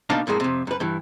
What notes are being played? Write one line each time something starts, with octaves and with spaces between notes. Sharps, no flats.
B2 A#3 D4 D#4 F5 A5
F2 A2 G#3 A#3
F2 C3
F#2 B4
G2 E3